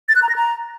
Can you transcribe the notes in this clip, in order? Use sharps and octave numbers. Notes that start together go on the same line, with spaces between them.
A6
F#6
A#5
A#6
A#5